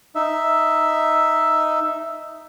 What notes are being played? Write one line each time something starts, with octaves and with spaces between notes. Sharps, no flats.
D#4 E5